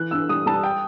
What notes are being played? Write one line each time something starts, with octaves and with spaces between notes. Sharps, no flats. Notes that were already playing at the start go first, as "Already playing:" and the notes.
Already playing: E3 F#6
G2 E6
G3 D#6
G3 A5
G5